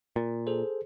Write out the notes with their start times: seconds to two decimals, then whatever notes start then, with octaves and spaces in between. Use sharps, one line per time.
0.16 A#2
0.47 G#4 A4 C5